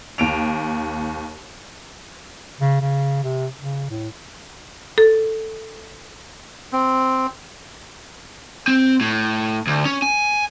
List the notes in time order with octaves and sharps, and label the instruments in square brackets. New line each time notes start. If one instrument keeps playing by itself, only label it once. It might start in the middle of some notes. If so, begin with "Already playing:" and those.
[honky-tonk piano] D#2 D7 F7
[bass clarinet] C#3
C#3
C3
C#3
A2
[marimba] A4
[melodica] C4
[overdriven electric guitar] C4
A2
D2
C#4
G#5